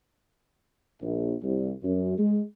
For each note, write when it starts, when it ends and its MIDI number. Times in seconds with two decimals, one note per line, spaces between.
1.01 1.33 34
1.43 1.71 36
1.83 2.16 42
2.18 2.41 56